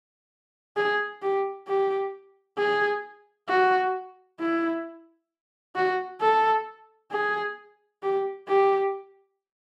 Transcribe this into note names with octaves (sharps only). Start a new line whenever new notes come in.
G#4
G4
G4
G#4
F#4
E4
F#4
A4
G#4
G4
G4